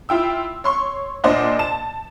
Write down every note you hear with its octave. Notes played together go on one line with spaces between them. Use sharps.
E4 F4 G5 E6
C#5 C6 C#6
A#2 D4 C5 D#5 F#5
A5 E7